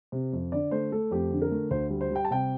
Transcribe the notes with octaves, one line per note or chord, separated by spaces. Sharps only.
C3
F2
D3 D5
A3 C5
A3 A4
F2 G4
D3
A#4
A3
D2 C5
G3
C5
G3 G5
A5
C3 G5